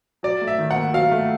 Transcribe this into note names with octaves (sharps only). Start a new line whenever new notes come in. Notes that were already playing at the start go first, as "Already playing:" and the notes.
F#3 D5
A3
E5
D#3
F#5
D#2
F#3 F5
A3